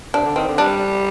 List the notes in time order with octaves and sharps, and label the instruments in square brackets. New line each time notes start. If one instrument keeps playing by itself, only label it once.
[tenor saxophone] C3 [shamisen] D4
[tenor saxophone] D3
[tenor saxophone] D#3 [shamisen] C4
[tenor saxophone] D3
[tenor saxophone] G3 [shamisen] D4